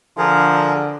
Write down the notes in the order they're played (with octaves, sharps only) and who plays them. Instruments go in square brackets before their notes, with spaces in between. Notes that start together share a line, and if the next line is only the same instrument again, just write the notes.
[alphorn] D3 [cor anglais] F3 [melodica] G#4 A#4